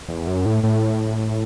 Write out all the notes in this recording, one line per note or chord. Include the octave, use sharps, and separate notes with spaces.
E2
F#2
A2
A2